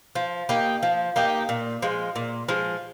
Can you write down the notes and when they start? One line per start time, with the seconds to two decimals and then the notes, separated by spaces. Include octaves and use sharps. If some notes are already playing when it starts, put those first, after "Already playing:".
0.15 F3
0.49 A#3 D#4 G4
0.83 F3
1.16 A#3 D#4 G4
1.49 A#2
1.82 F3 G#3
2.16 A#2
2.49 F3 G#3